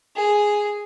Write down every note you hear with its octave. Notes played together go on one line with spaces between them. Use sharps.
G#4